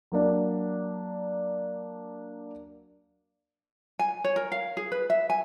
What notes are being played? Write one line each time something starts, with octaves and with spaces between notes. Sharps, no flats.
F#3 A#3 D4
G#5
C#5
A#4
F5
G#4
B4
E5
G#5